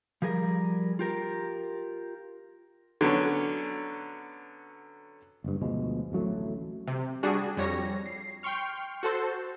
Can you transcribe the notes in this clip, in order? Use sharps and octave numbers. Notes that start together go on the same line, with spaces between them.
F3 G3 G#4 A#4
F4 G4 A#4
D3 F#3 B3 C#4
F#1 G2
D2 B2 F3 G#3
D1 A1 F#3 A3
C3
G3 D4 F#4 G#4
F2 G3 C#5 A#6
C7
G5 C6 C#6 F6
F#4 A4 C5